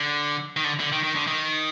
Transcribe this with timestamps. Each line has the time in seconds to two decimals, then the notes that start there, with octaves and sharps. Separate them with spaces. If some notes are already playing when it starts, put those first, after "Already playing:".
Already playing: D3
0.57 D#3
0.64 D3
0.80 D3
0.92 D#3
1.04 D#3
1.16 D3
1.27 D#3